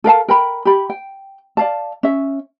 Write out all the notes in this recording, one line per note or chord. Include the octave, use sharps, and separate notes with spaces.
A4 A#4 F5 A5
A#4 G5 B5
G4 B5
G5
D5 F5 A5
C#4 E5